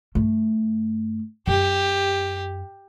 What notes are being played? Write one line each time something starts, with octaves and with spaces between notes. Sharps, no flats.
G2 A3
F#2 G4